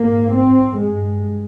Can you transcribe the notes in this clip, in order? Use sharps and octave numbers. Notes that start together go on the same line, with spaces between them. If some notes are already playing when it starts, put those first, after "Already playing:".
Already playing: G#2 A#3
C4
G2 G#3